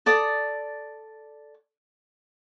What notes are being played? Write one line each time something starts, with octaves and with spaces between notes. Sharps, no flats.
A4 D5 D6 D#6